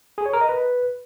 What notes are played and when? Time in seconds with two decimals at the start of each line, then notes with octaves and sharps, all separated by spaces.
0.18 G#4
0.26 C#5
0.33 A#4
0.41 D#5
0.49 B4